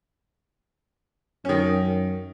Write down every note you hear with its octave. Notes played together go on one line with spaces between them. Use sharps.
F#2 D#3 C#4